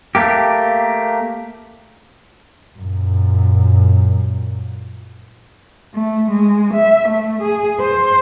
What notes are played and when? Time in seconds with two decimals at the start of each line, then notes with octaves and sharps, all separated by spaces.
0.15 A3 A#3 G4
2.78 F#2 A#2
5.94 A3
6.31 G#3
6.74 E5
7.09 A3
7.42 G#4
7.80 C5